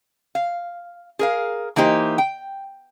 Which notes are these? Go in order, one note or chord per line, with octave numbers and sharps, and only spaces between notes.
F5
G#4 A#4 F5
E3 A#3 D#4 G4 C5
G5